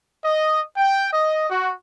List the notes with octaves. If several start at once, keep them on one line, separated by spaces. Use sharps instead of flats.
D#5
G5
D#5
F#4